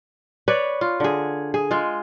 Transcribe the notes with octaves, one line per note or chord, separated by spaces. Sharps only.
B4 C#5 D5
F4
D3 G#4
G#4
G#3 F4